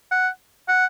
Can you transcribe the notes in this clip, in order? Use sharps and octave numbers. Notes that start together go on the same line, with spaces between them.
F#5
F#5